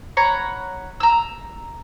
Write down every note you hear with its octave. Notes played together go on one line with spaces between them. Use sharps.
C#5 F#5 A#5 B5
A#5 E6